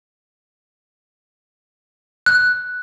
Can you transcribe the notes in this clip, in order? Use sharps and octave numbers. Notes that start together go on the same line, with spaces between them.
F#6